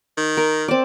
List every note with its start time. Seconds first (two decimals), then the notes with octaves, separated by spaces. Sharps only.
0.17 D#3
0.37 A#4
0.68 C4 D5